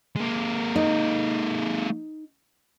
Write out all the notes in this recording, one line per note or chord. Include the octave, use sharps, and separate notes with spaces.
G#3 A#3
D#4